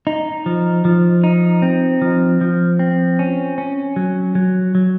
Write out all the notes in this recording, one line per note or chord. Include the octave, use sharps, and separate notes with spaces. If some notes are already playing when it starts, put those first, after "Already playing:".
D#4
F3
F3
D#4
C4
F3
F3
C4
C#4
C#4
F#3
F#3
F#3